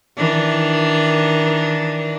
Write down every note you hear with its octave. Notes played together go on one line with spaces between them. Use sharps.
D#3 E3 D4